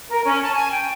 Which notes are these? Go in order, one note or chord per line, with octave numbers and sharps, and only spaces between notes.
A#4
C#4
A5
G#5
G5